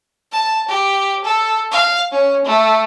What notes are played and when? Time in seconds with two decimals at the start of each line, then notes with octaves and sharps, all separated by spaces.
0.32 A5
0.68 G4
1.24 A4
1.71 F5
2.11 C#4
2.44 A3